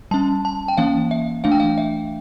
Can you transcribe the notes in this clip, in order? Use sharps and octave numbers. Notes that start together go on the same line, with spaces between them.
G3 C#4 A5
A5
G5
E3 A#3 C#4 F5
E5
E3 A3 D4 F5
G5
F5
E5